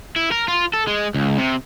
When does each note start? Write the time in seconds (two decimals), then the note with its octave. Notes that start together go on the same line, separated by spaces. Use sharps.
0.16 E4
0.31 A#4
0.48 F4
0.74 A4
0.88 G#3
1.14 C#2
1.38 C3